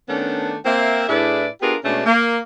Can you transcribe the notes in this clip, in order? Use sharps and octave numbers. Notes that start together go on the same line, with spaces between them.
D#3 A3 B3 C#4 D4
A#3 C4 E5
A2 D4 E4 G#4 B4 D5
B3 D4 F4 G4 G#4 A#4
B2 G#3 A3 C#4 D4
A#3